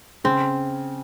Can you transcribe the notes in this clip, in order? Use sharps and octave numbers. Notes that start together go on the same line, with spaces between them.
C#3 C4